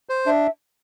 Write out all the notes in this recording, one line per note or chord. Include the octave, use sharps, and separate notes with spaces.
C5
D4 E5